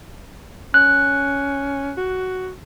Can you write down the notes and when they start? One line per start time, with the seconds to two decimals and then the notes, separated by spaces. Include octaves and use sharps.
0.74 C#4 F#6
1.98 F#4